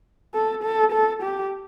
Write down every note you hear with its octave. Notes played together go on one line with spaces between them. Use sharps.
A4
A4
A4
G4